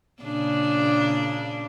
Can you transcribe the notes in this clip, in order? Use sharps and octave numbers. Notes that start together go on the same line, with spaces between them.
A#2 C#3 D4